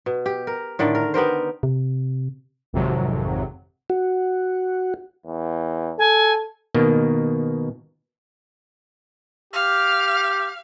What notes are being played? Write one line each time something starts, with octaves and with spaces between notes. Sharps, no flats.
B2
G4
A#4
A2 D3 D#3 D5
A#4
B3 G4 A#4 C5
C3
G#1 F2 C3 F#3
F#4
E2
A4 G#5
B2 D#3 A#3
G4 F5